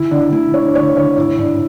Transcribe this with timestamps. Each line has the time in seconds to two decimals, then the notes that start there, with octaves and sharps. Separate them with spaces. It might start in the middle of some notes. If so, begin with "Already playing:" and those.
Already playing: D3 E4
0.11 D3 D4
0.32 A3 E4
0.54 D4 C#5
0.75 D3 C#5
0.97 D3 C#5
1.17 G#2 E4
1.39 G#2 D4